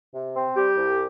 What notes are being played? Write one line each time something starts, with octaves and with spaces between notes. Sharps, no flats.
C3
C4
G3 G4
C2